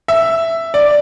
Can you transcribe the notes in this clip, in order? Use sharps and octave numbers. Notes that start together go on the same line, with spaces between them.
E5
D5